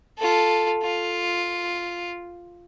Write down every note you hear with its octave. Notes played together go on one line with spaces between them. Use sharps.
F4 A4
F4